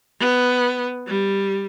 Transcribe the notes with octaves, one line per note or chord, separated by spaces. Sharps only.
B3
G3